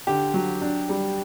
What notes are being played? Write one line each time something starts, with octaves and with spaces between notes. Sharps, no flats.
D3 G4
F#3
D4
G3